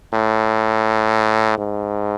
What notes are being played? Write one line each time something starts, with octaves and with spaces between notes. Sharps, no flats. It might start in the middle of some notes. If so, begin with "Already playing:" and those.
A2
G#2